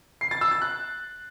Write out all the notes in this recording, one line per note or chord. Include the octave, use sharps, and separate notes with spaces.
C7
A6
E6
A6
F#6